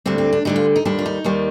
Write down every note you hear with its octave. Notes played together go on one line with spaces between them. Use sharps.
D2 D3 G3 C4
C4
D4
D2 D3 G3 D#4
F4
D#4
D#2 D#3 G3 D4
F4
D#4
D#2 D#3 G3